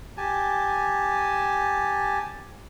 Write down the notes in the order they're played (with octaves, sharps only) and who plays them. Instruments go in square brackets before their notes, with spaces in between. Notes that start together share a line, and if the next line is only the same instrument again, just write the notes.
[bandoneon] G4 G#5 A5